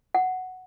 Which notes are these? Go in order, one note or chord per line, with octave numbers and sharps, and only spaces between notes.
F#5